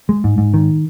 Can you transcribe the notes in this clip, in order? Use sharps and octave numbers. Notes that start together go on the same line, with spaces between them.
G#3
G#2
G#2
D#3